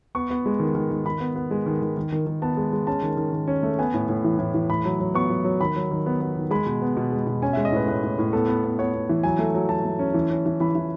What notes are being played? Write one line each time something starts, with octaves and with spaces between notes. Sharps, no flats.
B3 C#6
B3
G#3
D#3
D#3
D#3
D#3 B5
B3
B3
G#3
D#3
D#3
D#3
D#3
D#3
B3 A5
G#3
G#3
C#4 A5
D#3
D#3
D#3
C#4
A3
B3 G#5
A2
A2
E3
A2
E3
A2 B5
F#3
F#3
B3 C#6
F#3
F#3
D#3 B5
F#3
D#3
B3
B3
D#3
G#3 B5
B2
B3
B2
G#3
B2
C#4 G#5
G#3 E5
D#5
A2 B4
A2 B4
A2
A2
B3 A4
B3
B3
B3 C#5
B3
E3
F#3 G#5
A3
F#3
F#3 A5
A3
C#4
E3
C#4
E3
E3 B5
E3